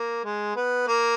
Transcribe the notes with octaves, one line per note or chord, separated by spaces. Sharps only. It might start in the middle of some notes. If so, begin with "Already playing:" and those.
Already playing: A#3
G#3
B3
A#3